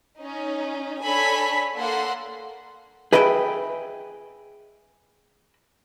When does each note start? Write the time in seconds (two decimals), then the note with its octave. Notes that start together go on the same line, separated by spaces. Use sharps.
0.19 C#4 D#4
1.03 D4 A4 C#5 G#5 B5 B6
1.77 A#3 A4 F#5 C6
3.13 G#4 B4 D#5 E5 F#5 G5